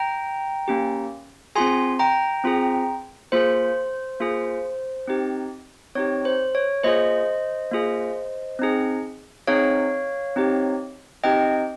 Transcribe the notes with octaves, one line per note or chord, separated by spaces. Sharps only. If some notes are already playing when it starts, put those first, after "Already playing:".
Already playing: G5 A#5
A#3 C#4 G4
C4 F4 G#4 G#5 C6
G5 A#5
C4 F4 G#4
A#3 F4 G#4 C5
A#3 F4 G#4
C4 D#4 G4
C4 D#4 G4 C#5
C5
C#5
A#3 F4 G#4 C5 D#5
A#3 F4 G#4
C4 D#4 G#4
C4 D#4 G#4 C#5 F5
C4 D#4 G4
C4 D#4 G4 D#5 G5